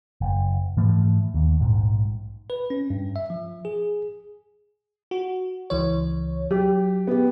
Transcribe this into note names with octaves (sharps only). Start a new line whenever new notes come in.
F#1
G#2 E3 F3 A3
D#2
A#1 G#2
B4
C#4
G2
E5
F3
G#4
F#4
C#2 E3 C#5
F#3 G4
B3 G4